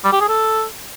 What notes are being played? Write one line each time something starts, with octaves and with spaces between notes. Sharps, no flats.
G3
G4
G#4
A4